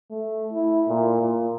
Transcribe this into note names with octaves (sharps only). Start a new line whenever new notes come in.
A3
E4
A#2
A#2